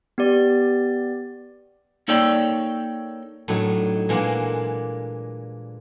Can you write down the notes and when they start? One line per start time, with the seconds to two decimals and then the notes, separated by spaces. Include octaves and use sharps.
0.18 B3 G4 D5
2.08 A#3 D#4 A4 C#5 D5 G5
3.48 A2 F#3 D4 D#4
4.09 A#2 E3 G#3 A#3 D4 F#5